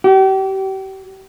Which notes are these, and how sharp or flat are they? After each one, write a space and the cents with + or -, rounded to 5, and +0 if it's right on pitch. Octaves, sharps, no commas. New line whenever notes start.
G4 -35